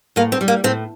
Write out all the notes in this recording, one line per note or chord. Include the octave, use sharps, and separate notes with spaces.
A2 A#3
C4
G3
A#3
A2 C4